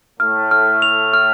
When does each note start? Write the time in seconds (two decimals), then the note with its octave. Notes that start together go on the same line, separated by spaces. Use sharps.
0.20 A2 A3 F6
0.51 F6
0.82 F7
1.14 F6